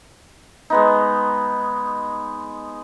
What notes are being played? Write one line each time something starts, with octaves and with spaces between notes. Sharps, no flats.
G#3 B3 D#4